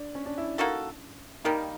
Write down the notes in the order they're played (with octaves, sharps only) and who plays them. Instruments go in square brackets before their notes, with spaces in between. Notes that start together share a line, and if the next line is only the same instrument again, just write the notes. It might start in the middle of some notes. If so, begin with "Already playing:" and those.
Already playing: [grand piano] D4
C#4
D4
E4
[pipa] A#3 D#4 F#4 A4
[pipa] D#3 G3 A#3 [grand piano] D#4